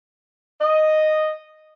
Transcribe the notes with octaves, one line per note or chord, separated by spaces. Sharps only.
D#5